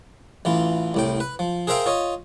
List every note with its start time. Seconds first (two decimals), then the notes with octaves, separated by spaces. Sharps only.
0.45 A1 E3 F4
0.94 C2 A2 G5
1.20 B4
1.39 F3
1.67 G#4 A#4 C5 E5 F5 G5
1.86 F4 C#5 D#5